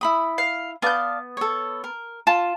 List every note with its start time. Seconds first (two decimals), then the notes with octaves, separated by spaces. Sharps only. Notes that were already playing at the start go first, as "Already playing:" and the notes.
0.01 E4 B5 D#6
0.38 F5
0.82 B3 D5 F5 A5 G6
1.37 A4 C#5
1.84 A#4
2.27 F4 A5